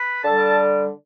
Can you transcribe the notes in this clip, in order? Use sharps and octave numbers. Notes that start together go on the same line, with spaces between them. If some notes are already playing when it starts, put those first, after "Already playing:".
Already playing: B4 B5
D3 G3 A4 A5